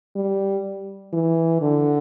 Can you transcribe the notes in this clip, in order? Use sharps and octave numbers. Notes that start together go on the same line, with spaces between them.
G3
E3
D3